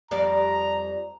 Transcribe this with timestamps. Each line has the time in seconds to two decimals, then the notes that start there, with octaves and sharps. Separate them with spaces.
0.11 F2 G3 D5 A#5